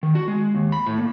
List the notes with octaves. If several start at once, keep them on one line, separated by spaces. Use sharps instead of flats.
D#3
F#4
G#3
D#2
B5
A2
A#3